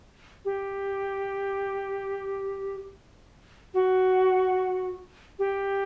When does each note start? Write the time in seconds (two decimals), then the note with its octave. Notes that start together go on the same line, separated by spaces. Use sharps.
0.45 G4
3.74 F#4
5.39 G4